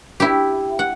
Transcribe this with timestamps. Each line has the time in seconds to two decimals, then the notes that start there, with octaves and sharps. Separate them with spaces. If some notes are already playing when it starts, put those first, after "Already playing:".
0.20 E4 G4
0.79 F#5